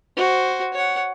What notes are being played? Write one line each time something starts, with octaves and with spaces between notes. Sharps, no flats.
F#4 C5
C#5 F#5